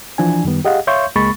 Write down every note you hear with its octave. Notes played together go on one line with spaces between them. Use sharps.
E3 F3 D4 G#5
F#2 D#3 G3 B3
G4 G#4 D#5 F5 F#5
C#5 E5 F5 C6 C#6 G6
C#2 G#3 A#3 B5 C#6 A6